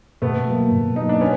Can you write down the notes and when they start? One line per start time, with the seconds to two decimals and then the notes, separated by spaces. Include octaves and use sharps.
0.22 B2 A3 B3
0.47 F#3 A#3
0.72 B2
0.96 F#3 A#3 D#4
1.09 D4
1.21 B3 C#4